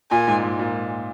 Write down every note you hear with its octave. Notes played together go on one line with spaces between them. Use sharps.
A#2 G#5
G#2
G#2
A#2